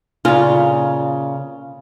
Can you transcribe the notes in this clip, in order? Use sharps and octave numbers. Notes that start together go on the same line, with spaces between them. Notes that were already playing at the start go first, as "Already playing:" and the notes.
A#2 C#3 F4